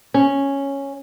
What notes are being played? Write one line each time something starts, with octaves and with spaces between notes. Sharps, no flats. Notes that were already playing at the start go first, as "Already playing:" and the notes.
C#4